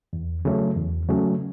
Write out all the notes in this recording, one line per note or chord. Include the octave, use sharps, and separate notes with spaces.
E2
C#3 F#3 A3 C#4
E2
C#3 F#3 A3 C#4